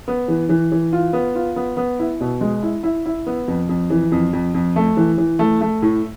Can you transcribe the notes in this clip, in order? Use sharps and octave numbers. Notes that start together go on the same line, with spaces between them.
B3
E3
E3
E3
F4
B3
F4
B3
B3
E4
B2
G#3
E4
E4
E4
B3
F2
F2
E3
F2
F2
F2
A3
E3
E3
A3
A3
A2